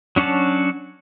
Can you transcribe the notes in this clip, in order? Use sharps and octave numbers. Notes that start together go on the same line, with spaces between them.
F#3 C#4 D4 F#4 A5